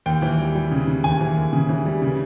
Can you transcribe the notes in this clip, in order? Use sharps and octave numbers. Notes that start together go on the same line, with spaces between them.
D#2 G5
E3
G3
G3
C#3
C#3
D#2 G#5
E3
D#2
C#3
E3
G3
C#3